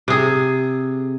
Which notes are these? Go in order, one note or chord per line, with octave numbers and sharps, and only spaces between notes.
C3 G#4